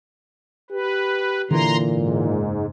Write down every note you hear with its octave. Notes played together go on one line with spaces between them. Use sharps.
G4 B4
A#2 D3 E3 A#5 C6
G#2
F#1